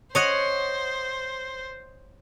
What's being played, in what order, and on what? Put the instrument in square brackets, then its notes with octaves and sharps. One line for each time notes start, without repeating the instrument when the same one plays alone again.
[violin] C5 [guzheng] C#5 D#5 F#5